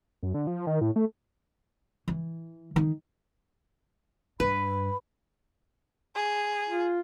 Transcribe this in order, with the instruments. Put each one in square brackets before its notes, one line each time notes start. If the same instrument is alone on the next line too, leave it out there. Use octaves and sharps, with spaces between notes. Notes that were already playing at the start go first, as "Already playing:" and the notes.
[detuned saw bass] F#2
D3
F3
D#3
A2
A3
[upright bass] E3
D#3
[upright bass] G2 [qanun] B4 [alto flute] B5
[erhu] G#4
[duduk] F4